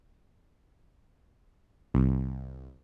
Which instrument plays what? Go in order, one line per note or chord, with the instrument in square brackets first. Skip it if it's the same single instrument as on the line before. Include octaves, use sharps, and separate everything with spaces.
[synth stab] C2